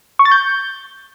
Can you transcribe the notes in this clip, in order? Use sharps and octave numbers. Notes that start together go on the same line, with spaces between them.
C#6
A6
G6